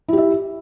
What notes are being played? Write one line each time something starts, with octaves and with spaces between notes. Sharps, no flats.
E4 G4 E5